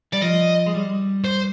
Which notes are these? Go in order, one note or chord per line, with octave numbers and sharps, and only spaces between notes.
G3 D5
F3 D#5
G#3
G3
C5